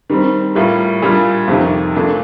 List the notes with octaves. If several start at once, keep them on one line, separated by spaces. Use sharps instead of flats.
D#3 G3 C4
A2 G3 A#3 F4
A#2 G3 D4 F4
F2 C3 D#3
A#2 A3 D4